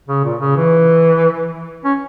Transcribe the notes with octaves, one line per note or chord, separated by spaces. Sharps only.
C#3
A#2
C#3
E3
C#4